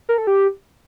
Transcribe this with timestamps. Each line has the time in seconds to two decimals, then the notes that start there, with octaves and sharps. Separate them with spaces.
0.09 A#4
0.18 A4
0.27 G4